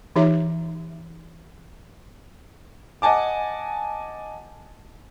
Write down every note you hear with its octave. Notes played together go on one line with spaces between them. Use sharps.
E3 D#4 G4 C#5 E5
D#5 F#5 G#5 A5 D6